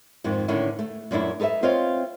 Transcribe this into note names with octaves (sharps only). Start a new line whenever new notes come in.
F2 G#2 D#3 F3
A2 D3 D#3 C#4 D4 E4
A3
F#2 A#2 A3 D4 E4
D#4 A4 B4 D5 E5
C4 F4 C#5 D#5 F5